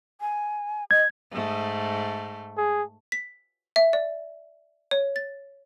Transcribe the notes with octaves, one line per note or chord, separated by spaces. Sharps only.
G#5
D#5 G#6
G#2 A3
G#4
B6
E5
D5
C#5
A6